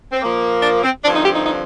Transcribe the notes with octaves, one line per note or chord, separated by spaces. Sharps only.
C4
A#2 F3 A#3
D4
C4
G2 D3 F3 C4 D4
D#4
G4
D#4
D#4